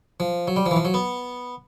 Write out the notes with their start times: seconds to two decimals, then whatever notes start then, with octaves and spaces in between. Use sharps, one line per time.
0.20 F3
0.48 F#3
0.56 G3
0.66 F3
0.71 E3
0.76 F3
0.85 F#3
0.94 B3